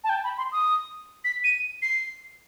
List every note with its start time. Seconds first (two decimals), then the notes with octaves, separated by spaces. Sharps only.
0.04 A5
0.09 G5
0.24 B5
0.38 C6
0.52 D#6
1.24 B6
1.44 D#7
1.82 C7